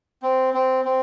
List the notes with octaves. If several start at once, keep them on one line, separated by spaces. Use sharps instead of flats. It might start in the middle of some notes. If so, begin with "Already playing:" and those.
C4
C4
C4